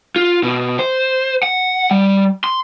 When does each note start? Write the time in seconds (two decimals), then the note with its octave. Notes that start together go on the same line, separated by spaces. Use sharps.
0.16 F4
0.43 B2
0.79 C5
1.43 F#5
1.91 G3
2.44 C6